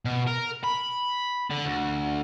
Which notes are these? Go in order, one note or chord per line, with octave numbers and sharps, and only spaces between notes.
B2
A#4
B5
D3
D2